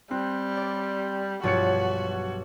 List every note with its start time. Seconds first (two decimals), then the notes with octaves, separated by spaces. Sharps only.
0.11 G3 C4 F#6
0.57 D5
1.43 B1 G2 F3 F#4 C#5 A6 C#7